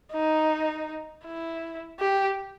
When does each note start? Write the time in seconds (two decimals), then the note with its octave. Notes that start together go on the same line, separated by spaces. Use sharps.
0.12 D#4
1.25 E4
2.00 G4